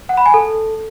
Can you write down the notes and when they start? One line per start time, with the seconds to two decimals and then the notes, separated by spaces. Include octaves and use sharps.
0.09 F#5
0.17 B5
0.26 G#5
0.34 A4